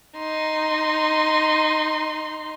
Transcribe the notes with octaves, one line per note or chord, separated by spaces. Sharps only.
D#4 C6